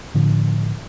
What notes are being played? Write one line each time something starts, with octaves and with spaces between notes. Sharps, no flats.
A2 D3 F3